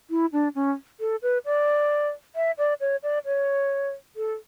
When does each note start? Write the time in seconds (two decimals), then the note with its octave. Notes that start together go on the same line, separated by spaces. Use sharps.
0.10 E4
0.33 D4
0.55 C#4
1.00 A4
1.22 B4
1.45 D5
2.36 E5
2.58 D5
2.81 C#5
3.03 D5
3.26 C#5
4.16 A4